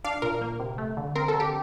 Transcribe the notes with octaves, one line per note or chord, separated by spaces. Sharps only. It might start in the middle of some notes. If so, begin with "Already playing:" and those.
D4 F5
A#2 A#4
A#3
C3
A3
D3
C4 A#4
A4
D3
G4